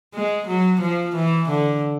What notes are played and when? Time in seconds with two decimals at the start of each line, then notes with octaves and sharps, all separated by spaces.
0.14 G#3
0.48 F#3
0.81 F3
1.16 E3
1.49 D3